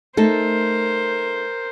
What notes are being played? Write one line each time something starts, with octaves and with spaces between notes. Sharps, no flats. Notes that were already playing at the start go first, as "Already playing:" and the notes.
A3 D#4 A4 A#4 C5